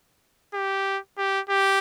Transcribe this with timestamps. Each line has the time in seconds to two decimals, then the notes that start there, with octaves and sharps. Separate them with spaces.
0.54 G4
1.18 G4
1.49 G4